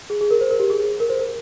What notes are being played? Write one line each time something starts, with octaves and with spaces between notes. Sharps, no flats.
G#4
G#4
A#4
C5
A#4
G4
G#4
A#4
C5
A#4